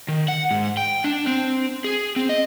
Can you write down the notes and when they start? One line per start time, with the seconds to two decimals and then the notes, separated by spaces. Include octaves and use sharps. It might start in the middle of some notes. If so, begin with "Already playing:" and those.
0.08 D#3
0.28 F#5
0.51 G#2
0.77 G5
1.04 D4
1.27 C4
1.84 G#4
2.16 C4
2.29 D#5